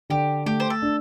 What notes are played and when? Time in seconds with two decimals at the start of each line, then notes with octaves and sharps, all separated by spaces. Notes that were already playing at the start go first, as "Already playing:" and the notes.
0.10 D3 G4
0.46 A3 G4
0.60 C5
0.70 A4
0.82 D4